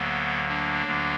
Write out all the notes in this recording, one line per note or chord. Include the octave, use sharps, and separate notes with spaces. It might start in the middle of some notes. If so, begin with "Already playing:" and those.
Already playing: D2 D3 F#3 A#3 B3
A#3 D4
D2 D3 F#3